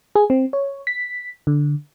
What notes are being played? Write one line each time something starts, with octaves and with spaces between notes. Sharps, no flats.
G#4
C4
C#5
B6
D3